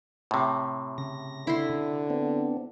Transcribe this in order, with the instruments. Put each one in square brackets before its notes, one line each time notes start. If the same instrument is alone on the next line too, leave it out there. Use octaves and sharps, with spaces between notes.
[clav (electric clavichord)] A2 C3
[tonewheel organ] C#3 A#6
[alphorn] D3 [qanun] E4 C6
[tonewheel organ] B3 C4 D4